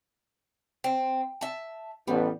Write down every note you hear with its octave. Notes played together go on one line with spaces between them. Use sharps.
C4
E5 A5
A1 G3 B3